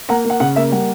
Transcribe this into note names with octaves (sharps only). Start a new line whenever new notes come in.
A#3 F#5 A#5
A#3
F#5
C#3 F#5
A#3 E5
G3 F#5